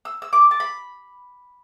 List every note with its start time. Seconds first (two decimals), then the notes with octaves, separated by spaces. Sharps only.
0.05 E6
0.22 E6
0.33 D6
0.51 A5
0.60 B5